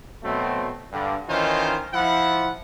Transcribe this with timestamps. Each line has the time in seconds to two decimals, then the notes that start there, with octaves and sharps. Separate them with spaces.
0.24 B2 F#3 A3 C4
0.93 G2 D3 G3
1.29 D#3 E3 C#4 D#4 F4 C5
1.93 F3 E4 F#5